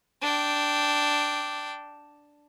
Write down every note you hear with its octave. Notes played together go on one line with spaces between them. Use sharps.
D4 G5